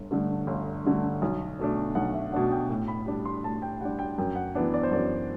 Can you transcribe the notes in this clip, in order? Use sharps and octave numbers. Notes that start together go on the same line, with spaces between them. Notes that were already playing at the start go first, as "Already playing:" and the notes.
Already playing: G1
G2 D3 A3
G1
G2 D3 A3
B1
B2 A3 D4
B1 F#5
E5
B2 A3 D4 F#5
G5
A2
B5
G3 D4
C6
A2 A5
G5
G3 D4 F#5
G5
F#2 G5
F#5
E3 B3 D4 F#5
D5
C5
F#2 D5